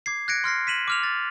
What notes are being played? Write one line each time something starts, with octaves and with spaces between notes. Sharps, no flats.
D6 G#6 C7
F#6 G#6 A#6 C#7 D7
C6 F6 A#6 C7
B6 D#7 E7 F#7
D6 F6 F7
A6